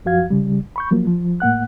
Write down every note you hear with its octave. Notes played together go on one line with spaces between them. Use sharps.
F#2 F3 F#4 F5 G#6
C#3 G3
B5 C#6 G6
F3 F#3 A#3
F3
A2 A#3 F#5 F#6